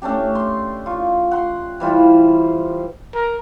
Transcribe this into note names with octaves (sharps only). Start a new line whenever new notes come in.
A3 C#4 D4 G4
C6
F4 C#6
F#5 C6
E3 G3 F4 C5
A#4